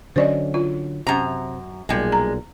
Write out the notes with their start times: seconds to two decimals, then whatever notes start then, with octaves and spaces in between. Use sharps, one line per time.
0.16 D3 F#3 C#4 C5 D5 D#5
0.54 F4
1.07 F#2 C3 A#5
1.89 B1 A#2 G3 G#3
2.12 A#5